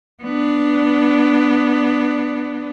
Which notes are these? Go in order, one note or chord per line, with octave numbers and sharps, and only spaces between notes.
B3 D4